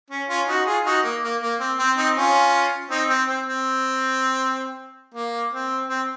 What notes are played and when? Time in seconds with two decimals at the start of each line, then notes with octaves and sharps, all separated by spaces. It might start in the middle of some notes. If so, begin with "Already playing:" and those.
0.10 C#4
0.29 C#4 F4
0.47 D#4 F#4
0.66 F4 G#4
0.85 D#4 F#4
1.03 A#3
1.23 A#3
1.41 A#3
1.60 C4
1.78 C4
1.97 C4 D#4
2.16 C#4 F4
2.90 C4 D#4
3.09 C4
3.28 C4
3.46 C4
5.14 A#3
5.52 C4
5.89 C4